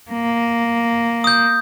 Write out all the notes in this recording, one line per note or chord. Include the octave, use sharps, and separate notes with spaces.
A#3
D#6 G6